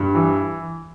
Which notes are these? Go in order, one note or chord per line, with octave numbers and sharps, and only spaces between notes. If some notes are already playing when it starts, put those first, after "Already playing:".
Already playing: G2
E3